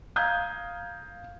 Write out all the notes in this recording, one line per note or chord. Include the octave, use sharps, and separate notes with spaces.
F5 A#5 D#6 G6 G#6